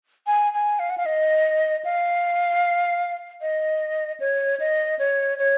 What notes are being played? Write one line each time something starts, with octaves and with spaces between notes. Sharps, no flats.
G#5
G#5
F5
F#5
F5
D#5
F5
D#5
C#5
D#5
C#5
C#5